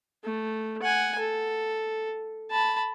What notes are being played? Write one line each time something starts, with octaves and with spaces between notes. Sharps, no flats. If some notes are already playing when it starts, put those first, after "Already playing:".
A3
F#5 G#5
A4
A5 B5